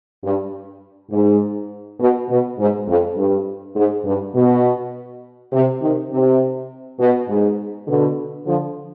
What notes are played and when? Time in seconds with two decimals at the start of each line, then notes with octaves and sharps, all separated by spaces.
0.23 G2
1.11 G#2
2.00 B2
2.29 B2
2.58 G#2
2.88 F2
3.17 G2
3.76 G#2
4.05 G2
4.35 B2
5.53 C3
5.82 C3 D#3
6.11 C3
7.00 B2
7.29 G#2
7.87 B2 D3
8.46 D3 F3